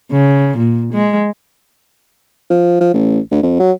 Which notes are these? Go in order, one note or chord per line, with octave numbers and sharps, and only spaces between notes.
C#3
A#2
G#3
F3
F3
A1
D2
F2
F#3